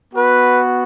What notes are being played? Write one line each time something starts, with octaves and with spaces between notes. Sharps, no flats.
B3 F#4 B4